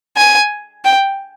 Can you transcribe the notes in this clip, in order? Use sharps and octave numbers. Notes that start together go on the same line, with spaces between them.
G#5
G5